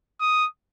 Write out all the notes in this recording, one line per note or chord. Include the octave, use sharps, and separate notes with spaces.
D#6